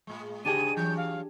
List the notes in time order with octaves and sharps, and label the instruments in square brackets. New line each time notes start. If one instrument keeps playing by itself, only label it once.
[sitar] A2 G#3
[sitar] G#2 C#3 D#5 [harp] D4 G4 G#4 [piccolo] D#7
[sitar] E3 F#3 [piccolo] G6
[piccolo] F5